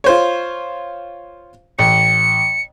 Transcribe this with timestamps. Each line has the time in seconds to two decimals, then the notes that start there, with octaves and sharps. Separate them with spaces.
0.04 F4 C5 C#5
1.79 A1 C#7